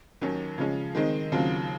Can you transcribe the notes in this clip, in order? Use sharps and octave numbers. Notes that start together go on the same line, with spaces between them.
D#2 D#3 F#3 C#4
C#3 F3 G#3 C#4
D#3 G#3 C4 D#4
D#2 C#3 F#3 C4 F4